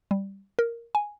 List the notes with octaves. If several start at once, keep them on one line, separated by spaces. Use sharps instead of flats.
G3
A#4
G#5